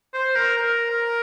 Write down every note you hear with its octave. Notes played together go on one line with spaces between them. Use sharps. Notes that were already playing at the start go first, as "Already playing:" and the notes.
C5
A#4
A#4
A#4